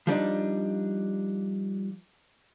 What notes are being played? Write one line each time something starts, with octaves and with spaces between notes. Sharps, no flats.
F3 G3 D4 D#4